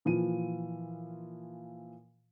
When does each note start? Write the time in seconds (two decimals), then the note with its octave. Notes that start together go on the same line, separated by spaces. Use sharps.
0.05 A#2 E3 F3 F4 D#7